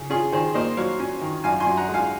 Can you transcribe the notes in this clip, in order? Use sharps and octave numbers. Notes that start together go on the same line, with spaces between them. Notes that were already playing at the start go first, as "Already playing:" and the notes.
Already playing: C#3
C#4 F4 G#4
D#3 G#4 C5
A#3 C5 D#5
F#3 C#5 F5
C#4
D#3
F#2 F5 G#5
G#5 C6
F#2
F#5 A#5
G#3
F5 G#5